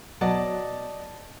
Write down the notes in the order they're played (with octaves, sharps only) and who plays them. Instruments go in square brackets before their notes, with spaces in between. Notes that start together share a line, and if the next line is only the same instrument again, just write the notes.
[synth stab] B2 F#3 [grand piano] D5 D#5 A5